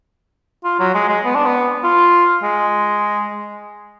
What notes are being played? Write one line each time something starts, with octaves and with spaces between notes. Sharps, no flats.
F4
F#3
G#3
G#3
B3
D4
B3
F4
G#3